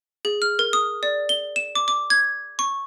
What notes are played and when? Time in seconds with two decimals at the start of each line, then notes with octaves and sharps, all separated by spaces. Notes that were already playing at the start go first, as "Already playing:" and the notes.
0.25 G#4
0.42 F6
0.59 A#4
0.73 D#6
1.03 D5
1.29 G7
1.56 E7
1.75 D6
1.88 D6
2.10 G#6
2.59 C#6